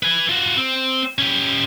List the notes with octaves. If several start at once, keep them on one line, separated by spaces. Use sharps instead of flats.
B4 G#5
F4 F#4
C4
C#4 G4